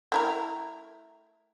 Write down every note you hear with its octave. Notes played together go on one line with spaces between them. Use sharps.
A3 E4 A#4